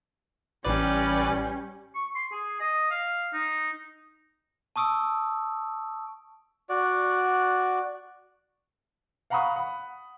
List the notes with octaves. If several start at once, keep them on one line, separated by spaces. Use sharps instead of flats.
A1 G3 C#4 B4 D5
C#6
C6
G#4
D#5
F5
D#4
A5 C#6 D#6 E6 D7
F#4 D5
F5 F#5 A#5 B5 C#6 D#6
F#5 B5